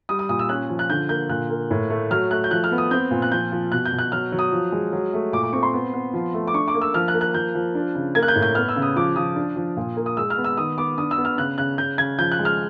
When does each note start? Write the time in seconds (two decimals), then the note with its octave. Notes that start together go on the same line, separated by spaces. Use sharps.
0.09 G3 D#6
0.19 D#6
0.29 A#2 D#6
0.39 E6
0.49 C#4 F#6
0.69 F3
0.79 F#6
0.90 D3 G6
1.09 A#3 G6
1.29 A#2 F#6
1.50 A#3
1.70 A2
1.90 A3
2.10 F#3 F6
2.31 A3 F#6
2.44 G6
2.51 F3 F#6
2.64 F6
2.71 B3
2.78 D#6
2.91 C4 G6
3.11 A#2
3.22 F#6
3.32 F3 G6
3.52 F3
3.72 B2 F#6
3.85 G6
3.92 B2
3.99 F#6
4.12 F#3 F6
4.32 F#3
4.39 D#6
4.52 F3
4.72 G#3
4.93 F#3
5.14 A3
5.33 A#2 D6
5.43 D6
5.53 C4 C#6
5.63 C6
5.73 B3
5.94 B3
6.13 F3
6.34 A3
6.47 D6
6.54 D4 C#6
6.68 D6
6.74 A#3
6.81 E6
6.94 F3 F6
7.08 F#6
7.14 A#3
7.21 F#6
7.34 F3 G6
7.55 F3
7.75 D4
7.95 C#3
8.15 A#3 G#6
8.23 F#6
8.28 G6
8.36 A2
8.42 G6
8.55 B3 F6
8.69 E6
8.76 C#3
8.82 D#6
8.96 F3 D6
9.16 F3 D#6
9.36 D4
9.56 F3
9.77 A#2
9.97 A#3
10.06 D#6
10.17 G#3 E6
10.30 F6
10.37 B3
10.44 E6
10.57 D#3 D#6
10.77 B3 D6
10.98 D4 D#6
11.11 E6
11.17 B3
11.25 F6
11.38 C#3 F#6
11.58 C#3 F#6
11.78 C#3 G6
11.98 C#3 G#6
12.19 F3 G6
12.32 F#6
12.39 G#3
12.45 F6